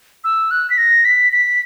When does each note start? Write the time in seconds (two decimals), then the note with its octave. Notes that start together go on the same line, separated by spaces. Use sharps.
0.24 E6
0.51 F#6
0.70 B6
0.78 A#6
1.05 B6
1.33 B6